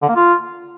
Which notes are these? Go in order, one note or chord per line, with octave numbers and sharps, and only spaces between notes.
D3
A#3
F4